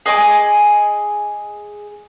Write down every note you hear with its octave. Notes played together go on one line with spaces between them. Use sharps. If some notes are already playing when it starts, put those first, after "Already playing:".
G#4 D#5 G#5 D6